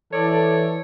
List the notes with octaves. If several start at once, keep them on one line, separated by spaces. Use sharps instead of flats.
E3 A4 C#5 D5